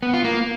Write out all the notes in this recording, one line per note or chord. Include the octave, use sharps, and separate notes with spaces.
B3
F4
A#3